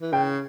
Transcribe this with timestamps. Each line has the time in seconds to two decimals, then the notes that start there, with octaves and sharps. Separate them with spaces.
0.01 E3
0.13 C#3 G5